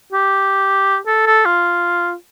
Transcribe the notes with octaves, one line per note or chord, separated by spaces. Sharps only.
G4
A4
A4
F4